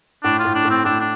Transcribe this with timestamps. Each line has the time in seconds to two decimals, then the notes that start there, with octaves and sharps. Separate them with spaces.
0.23 A2 D4
0.39 F4
0.45 A2
0.55 D4
0.65 A2
0.70 C4
0.85 A2 D4
1.00 D4